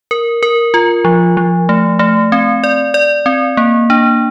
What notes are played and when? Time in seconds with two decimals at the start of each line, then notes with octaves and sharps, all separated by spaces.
0.11 A#4
0.43 A#4
0.74 F4
1.05 F3
1.37 F3
1.69 A3
1.99 A3
2.32 C4
2.64 D5
2.94 D5
3.26 C4
3.57 A#3
3.90 D4